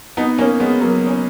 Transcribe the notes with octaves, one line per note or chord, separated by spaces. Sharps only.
B3 D#4
A#3 C#4
G#3 B3
F#3 A#3
C#4